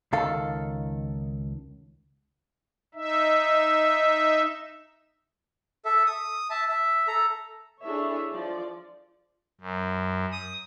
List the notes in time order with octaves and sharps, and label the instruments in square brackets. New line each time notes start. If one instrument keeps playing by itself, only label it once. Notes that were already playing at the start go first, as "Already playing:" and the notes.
[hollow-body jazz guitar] C#2 D#3 A4 F5
[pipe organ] D#4 E5
[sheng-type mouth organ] A4 E5
D#6
E5 A5
E5
A4 A#5
[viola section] D4 E4 G#4 A4 C#5 E5
F3 D5
[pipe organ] F#2
D#6